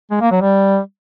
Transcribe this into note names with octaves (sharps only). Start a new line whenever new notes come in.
G#3
A#3
F#3
G3